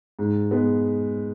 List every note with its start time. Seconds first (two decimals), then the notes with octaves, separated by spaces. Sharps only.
0.19 G#2
0.51 G#3 B3